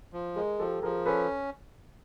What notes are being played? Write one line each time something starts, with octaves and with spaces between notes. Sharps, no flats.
F3
G#3 G#4 A#4
F3 G4 A4
F3 G#4 A#4
C#4 A4 B4